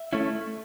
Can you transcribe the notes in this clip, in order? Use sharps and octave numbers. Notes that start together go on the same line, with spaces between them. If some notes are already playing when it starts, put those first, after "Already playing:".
Already playing: E5
A3 C#4 E4